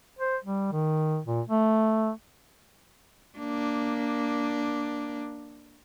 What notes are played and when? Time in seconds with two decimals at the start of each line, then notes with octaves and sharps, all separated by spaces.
0.19 C5
0.44 G3
0.72 D#3
1.26 A#2
1.50 A3
3.38 A#3 D4